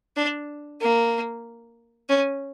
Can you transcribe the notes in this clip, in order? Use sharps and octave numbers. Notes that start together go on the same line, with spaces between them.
D4
A#3
C#4